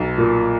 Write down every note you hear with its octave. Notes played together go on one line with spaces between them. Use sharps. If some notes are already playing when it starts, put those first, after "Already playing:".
Already playing: B1
A#2